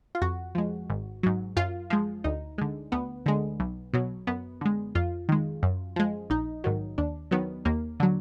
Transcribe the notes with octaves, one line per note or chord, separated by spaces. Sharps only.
F4
F2 F#4
F3 G#3
G#1
G#2 F#3
F#2 F4
F3 G#3
D2 D#4
D3 G#3
D2 B3
D3 G#3
B1
B2 F#3
F#2 B3
D3 G#3
F2 F4
D#3 G#3
F#2
F3 G#3
A#1 D#4
G#2 D#3 F#3
D#2 D4
D#3 F#3 B3
D#2 A#3
D3 F#3